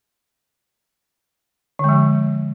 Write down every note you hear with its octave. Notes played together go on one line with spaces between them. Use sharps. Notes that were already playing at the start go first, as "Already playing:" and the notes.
D3 F3 G#3